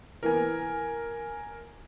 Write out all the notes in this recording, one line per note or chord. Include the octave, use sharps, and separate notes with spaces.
E3 A#3 B3 A#4 G#5